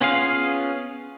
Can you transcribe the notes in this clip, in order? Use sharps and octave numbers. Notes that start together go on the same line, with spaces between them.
B3 C#4 F4 G#4 F5